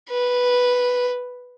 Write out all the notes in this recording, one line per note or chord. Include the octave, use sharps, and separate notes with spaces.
B4